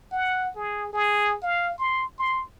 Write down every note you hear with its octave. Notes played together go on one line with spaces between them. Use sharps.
F#5
G#4
G#4
F5
C6
C6